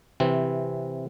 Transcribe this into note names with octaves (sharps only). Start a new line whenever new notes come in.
C3 E3 C4